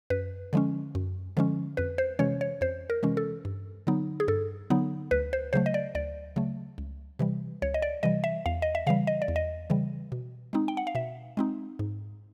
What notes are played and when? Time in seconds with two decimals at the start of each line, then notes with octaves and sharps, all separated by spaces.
0.10 F#2 B4
0.53 D3 F3 G#3 C#4
0.95 F#2
1.37 D3 F3 G#3 C#4
1.77 F2 B4
1.98 C5
2.19 C3 E3 G#3 C#4 C#5
2.41 C#5
2.61 F2 C5
2.90 A#4
3.03 C3 E3 G#3 C#4
3.17 A4
3.45 G2
3.87 D3 F#3 B3 D#4
4.20 G#4
4.28 G2 A4
4.70 D3 F#3 B3 D#4
5.11 D2 B4
5.33 C5
5.53 C#3 F#3 A3 C5
5.66 D#5
5.74 D5
5.95 D2 D5
6.36 C#3 F#3 A3
6.78 C#2
7.19 C3 E3 G3
7.62 C#2 C#5
7.74 D#5
7.82 D5
8.03 C3 E3 G3 D#5
8.24 E5
8.46 E2 F5
8.62 D#5
8.75 E5
8.87 C#3 E3 G3 F5
9.07 D#5
9.22 D5
9.28 E2
9.36 D#5
9.70 C#3 E3 G3
10.12 B2
10.53 G#3 C4 D#4
10.68 G5
10.77 F#5
10.87 F5
10.95 B2 E5
11.37 G#3 C4 D#4
11.79 G#2